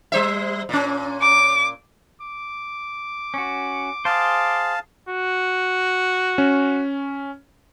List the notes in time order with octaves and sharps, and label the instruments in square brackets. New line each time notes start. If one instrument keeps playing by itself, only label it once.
[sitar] G3 C5 E5
A#2 C#4
[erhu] D6
[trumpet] D6
[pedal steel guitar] C#4 F#4
[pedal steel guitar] G#4 C5 [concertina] F5 A5
[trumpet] F#4
[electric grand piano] C#4